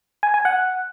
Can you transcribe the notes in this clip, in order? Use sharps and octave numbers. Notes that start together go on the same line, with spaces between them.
G#5
G#5
F#5